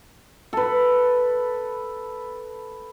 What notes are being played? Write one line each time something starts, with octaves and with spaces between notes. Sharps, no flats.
A4 B4